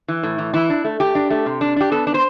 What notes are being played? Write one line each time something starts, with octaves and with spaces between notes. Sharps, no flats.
E3
A2
E3
E3 E4
D4
A3
A3 G4
D4
A3
C3
D4
D4 G4
B3 A4
D4
C5